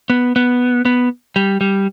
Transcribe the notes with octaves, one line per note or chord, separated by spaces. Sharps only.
B3
B3
B3
G3
G3